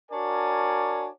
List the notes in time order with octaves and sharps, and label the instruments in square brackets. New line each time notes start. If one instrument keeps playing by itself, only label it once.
[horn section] D4 F#4 A#4 C#5 D5 G#5